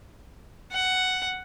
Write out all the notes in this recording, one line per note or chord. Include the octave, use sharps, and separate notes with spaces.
F#5